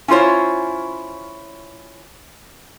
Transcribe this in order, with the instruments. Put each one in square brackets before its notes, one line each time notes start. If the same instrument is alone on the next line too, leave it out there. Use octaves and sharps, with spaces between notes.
[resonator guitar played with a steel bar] C#4 E4 F4 C5 C#5